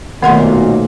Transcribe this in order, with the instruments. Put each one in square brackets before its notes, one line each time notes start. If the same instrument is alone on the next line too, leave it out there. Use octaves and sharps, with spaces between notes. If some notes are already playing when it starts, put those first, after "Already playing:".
[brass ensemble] B1 A#2 [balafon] D#3 A#4 C6 [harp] A3 C5 [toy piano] F#5